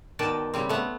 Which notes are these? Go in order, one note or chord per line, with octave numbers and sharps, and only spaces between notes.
B2 D#3 D5 G5 A5
C#3 G3 C4
A3 B3